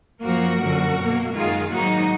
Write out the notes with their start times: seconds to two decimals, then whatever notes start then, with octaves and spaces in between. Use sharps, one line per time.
0.23 F#2 F3 A#3 F#4 A#4
0.60 F#2 D3 F3
0.96 B2 A#3
1.32 F#2 D#3 G#3 F4 G#4
1.69 G#2 D#3 F#3 A#3 D#4 F#4